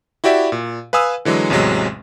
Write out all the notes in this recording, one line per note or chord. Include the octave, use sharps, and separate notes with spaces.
E4 F#4 G4 D5 E5
A#2
B4 F5 G#5 D#6 E6
D3 E3 F#3 G#3
A1 E2 C3 F#3 G#3